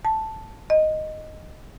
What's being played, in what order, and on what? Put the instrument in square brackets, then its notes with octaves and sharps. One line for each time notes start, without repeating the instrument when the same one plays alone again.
[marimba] A5
D#5